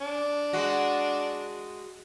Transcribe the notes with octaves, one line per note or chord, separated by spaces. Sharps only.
D4
G#3 F#4